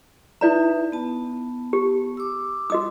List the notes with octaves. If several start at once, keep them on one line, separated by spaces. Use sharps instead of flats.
D#4 E4 B4 D5 E5 A#5
B3 A5
G4
D6 E6
F#4 D#5 D#6